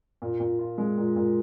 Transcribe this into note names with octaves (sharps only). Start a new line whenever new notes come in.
A#2
A#2
F4
G#3
A#2
A#2